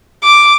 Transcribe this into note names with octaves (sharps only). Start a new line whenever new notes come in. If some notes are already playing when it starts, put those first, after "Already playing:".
D6